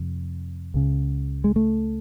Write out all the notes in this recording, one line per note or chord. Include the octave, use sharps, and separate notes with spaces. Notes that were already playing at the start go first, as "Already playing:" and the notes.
Already playing: F2 C3
C#2 C#3
G#3
A3